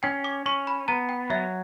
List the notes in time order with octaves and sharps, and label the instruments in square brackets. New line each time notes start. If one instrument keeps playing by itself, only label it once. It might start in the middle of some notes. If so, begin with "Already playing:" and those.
[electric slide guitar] C#4 [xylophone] G5
[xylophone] D6
[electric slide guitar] C#4 [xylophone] C#6
[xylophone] B5
[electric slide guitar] B3 [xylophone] A#5
[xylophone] G5
[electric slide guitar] F#3 [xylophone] E5